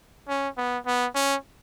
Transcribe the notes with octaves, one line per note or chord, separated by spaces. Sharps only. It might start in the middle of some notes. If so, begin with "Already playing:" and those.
C#4
B3
B3
C#4